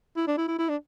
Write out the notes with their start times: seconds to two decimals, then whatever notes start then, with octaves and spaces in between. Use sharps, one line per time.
0.16 E4
0.27 D4
0.37 E4
0.48 E4
0.59 E4
0.69 D4